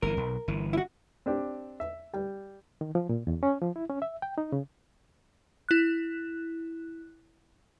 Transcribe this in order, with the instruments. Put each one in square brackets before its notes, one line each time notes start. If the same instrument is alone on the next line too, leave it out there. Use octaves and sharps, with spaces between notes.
[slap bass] G1 A#2 E3 [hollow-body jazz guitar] A#4
[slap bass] B1
G1 E3
[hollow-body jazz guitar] E4 F#4
[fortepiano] C4 D4 G4
E5
G3
[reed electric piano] D#3
F3
A#2
E2
C#4
F3
E4
C#4
E5
G5
D#4
C#3
[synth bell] E4 F#6